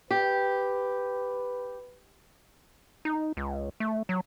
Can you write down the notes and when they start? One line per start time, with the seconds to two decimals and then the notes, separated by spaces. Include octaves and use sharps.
0.11 G4 B4
3.05 D#4
3.37 C#2
3.80 A3
4.09 F#3